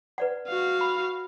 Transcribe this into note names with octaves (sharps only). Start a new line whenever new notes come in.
B4 D5 F#5
F#4 F5
B5